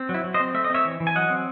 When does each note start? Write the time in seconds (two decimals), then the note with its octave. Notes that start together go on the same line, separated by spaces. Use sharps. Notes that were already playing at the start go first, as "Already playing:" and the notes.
Already playing: C4
0.09 F#3
0.14 E4
0.24 F#3
0.34 C5 D#5
0.40 C4
0.54 A3 E5
0.64 D#5
0.70 C4 C#5 E5
0.85 E3
1.00 E3
1.07 G#5
1.15 F#3 D#5 F#5
1.30 C4